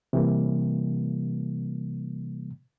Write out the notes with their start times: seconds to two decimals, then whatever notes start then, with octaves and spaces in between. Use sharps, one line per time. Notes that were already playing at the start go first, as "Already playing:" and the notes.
0.13 C3 E3 G3 A#3